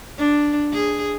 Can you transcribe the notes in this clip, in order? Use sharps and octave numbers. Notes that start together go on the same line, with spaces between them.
D4
G#4